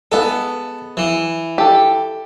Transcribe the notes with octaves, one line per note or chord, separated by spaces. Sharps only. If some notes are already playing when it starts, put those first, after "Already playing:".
G#3 B3 A4
E3
G4 A4